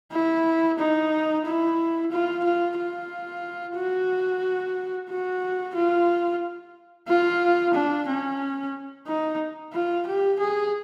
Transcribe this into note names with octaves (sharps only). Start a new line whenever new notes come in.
E4
D#4
E4
F4
F4
F4
F#4
F#4
F4
F4
D4
C#4
D#4
F4
G4
G#4